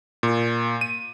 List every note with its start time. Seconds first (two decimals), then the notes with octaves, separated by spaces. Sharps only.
0.23 A#2
0.81 D#7